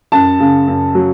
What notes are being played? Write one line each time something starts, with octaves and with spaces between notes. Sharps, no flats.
F#2 A5
C#3
F#2
F#3